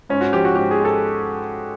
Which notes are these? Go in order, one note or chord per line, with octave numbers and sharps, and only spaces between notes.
G#2 C#4
F#4
F3 G4
F#4
G#2 G4
G#4
G#3
A4